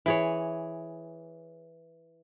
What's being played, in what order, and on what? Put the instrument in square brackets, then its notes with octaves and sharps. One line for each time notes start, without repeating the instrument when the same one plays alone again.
[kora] E3 G#4 C#5